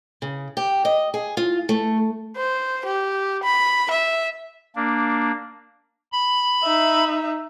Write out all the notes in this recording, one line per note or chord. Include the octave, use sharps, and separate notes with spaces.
C#3
G4
D#5
G#4
F4
A3
C5
G4
B5
E5
A#3 D4
B5
D#4 E5